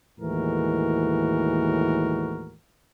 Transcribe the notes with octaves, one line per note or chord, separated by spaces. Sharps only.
D#2 A2 E3 G#3 F#4 A#4